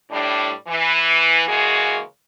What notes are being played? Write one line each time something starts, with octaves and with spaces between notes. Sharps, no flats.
A2 G3 D4
E3
C#3 E3 G#3 A#3 F#4 G#4